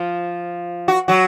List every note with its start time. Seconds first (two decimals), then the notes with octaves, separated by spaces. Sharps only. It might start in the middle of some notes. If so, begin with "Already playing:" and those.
Already playing: F3 F4
0.88 F#4
1.08 F#3 F#4